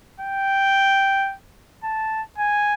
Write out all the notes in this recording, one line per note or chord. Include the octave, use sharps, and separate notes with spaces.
G5
A5
G#5